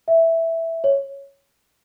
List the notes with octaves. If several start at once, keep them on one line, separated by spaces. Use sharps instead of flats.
E5
C#5